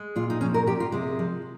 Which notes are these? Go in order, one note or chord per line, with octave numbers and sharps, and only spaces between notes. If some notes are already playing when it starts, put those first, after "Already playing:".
Already playing: G#3
A#2 F4
D#4
F3 C#4
A#4
F3 G4
F4
C3 G#3
F3